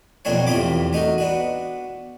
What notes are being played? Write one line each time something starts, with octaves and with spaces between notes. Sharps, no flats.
B1 F2 A#3 C4 D4 C#5
E2 A2 C3 F4 B5 D6
A3 D#4 F#4 A#4
B3 D4 F#4